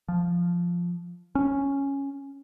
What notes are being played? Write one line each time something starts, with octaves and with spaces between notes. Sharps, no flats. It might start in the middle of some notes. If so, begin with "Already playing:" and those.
F3
C#4